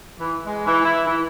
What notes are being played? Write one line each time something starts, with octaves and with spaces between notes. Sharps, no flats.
E3
G#3
E3
E4
E3